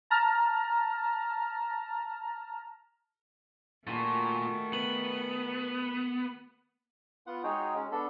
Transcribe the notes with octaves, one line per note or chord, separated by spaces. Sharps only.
A5 A#5 F6
A#2 D#3 A3 F#4 G#5 A5
B3 F#7
B3 F4 F#5
G#3 D#4 F#4 G#4 C#5 G5
G#3 C#4
B3 D4 A4